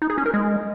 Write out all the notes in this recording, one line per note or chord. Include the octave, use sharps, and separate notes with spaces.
D#4
G#4
C#4
A#4
G#3